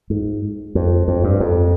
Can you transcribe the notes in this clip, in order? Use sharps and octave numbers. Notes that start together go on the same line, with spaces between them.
G#2
F2
F2
G2
F2